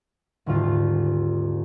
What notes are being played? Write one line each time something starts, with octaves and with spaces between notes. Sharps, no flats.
D#1 D2 G#2 F4